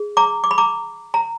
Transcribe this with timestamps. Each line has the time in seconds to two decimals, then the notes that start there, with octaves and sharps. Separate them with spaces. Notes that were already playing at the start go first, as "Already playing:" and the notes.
Already playing: G#4
0.17 A#5 D6
0.44 D6
0.51 B5
0.58 A#5 D6
1.14 A#5